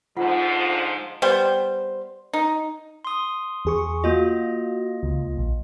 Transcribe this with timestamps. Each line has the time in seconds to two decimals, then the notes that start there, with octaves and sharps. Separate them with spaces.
0.17 G#2 D3 F3 F4 F#5
1.22 G3 B3 C5
2.33 D#4
3.05 C6 D#6
3.65 E2 G#4 C#6
4.04 A#3 F4 F#4 D#5
5.03 C#2
5.37 A#1